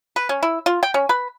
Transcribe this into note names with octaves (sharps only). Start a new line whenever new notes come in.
B4
C#4
E4
F4
G5
C#4
B4